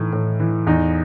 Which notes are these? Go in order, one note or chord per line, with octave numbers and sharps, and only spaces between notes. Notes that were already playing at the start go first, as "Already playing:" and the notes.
Already playing: A2 E3 D#4
A2
E3
E2 D#4